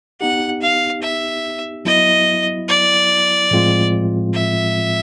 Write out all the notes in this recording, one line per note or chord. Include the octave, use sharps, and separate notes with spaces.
B3 D#4 G4 F#5
F5
E5
F#3 B3 E4 D#5
D5
A2 F3 G#3 C4 F4
E5